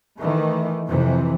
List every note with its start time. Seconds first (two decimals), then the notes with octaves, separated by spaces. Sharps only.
0.18 D#3 E3 A3
0.87 F2 C3 E3